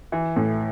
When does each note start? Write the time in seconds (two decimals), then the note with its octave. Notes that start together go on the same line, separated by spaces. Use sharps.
0.12 E3
0.36 A2